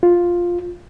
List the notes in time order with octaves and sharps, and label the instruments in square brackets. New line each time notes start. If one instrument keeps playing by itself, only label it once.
[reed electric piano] F4